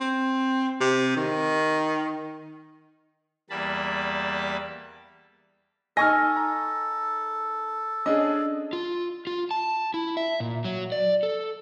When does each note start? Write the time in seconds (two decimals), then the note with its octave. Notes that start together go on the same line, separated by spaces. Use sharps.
0.01 C4
0.80 C3
1.16 D#3
3.50 E2 G3 A#3 A5 B5
5.97 D#4 A4 D#5 G#5 C#6 F6 A#6
6.37 A#5
8.06 C#4 D4 G#4 D#5
8.73 F4
9.27 F4
9.51 A5
9.94 E4
10.17 E5
10.40 A#2
10.65 F#3
10.92 D5
11.23 A4